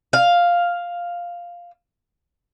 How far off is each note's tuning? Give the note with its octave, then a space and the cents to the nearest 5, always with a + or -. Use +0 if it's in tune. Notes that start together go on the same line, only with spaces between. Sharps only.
F5 +0